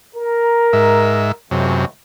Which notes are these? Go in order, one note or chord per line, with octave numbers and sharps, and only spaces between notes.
A#4 A#5
G#2 E5
C#2 F#2 C3 E3 A3